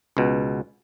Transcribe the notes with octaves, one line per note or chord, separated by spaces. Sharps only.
C#2 B2